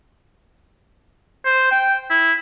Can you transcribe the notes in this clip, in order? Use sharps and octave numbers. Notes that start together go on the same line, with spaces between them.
C5
G5
E4